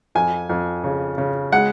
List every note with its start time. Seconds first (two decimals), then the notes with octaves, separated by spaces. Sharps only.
0.15 F2 G#5
0.49 F2
0.84 C#3
1.18 C#3
1.52 G#3 F#5